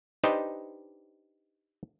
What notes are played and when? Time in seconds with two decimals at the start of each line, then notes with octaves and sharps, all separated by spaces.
0.24 D4 D#4 G4 B4 C5 D#5